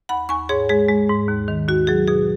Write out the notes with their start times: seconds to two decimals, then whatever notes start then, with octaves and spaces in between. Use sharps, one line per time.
0.09 D#2 F#5 B5
0.29 D#2 G#5 C#6
0.49 G#2 G#4 C#5
0.70 G#3 G#4
0.89 G#3
1.09 G#2
1.28 D#2
1.48 D#3
1.68 D#2 F#4
1.87 F#3 G#4
2.07 B2 G#4